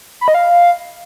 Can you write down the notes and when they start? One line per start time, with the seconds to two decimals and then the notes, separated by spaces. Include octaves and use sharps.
0.21 B5
0.28 D#5
0.34 F5